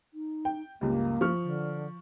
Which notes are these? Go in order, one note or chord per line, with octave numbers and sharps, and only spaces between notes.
D#4
G5
C#2 G2 A#3
F3 C#6 F6
D3